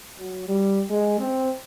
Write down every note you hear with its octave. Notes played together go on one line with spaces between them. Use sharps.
F#3
G3
G#3
C4